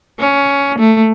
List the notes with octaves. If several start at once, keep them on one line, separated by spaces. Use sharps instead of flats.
C#4
A3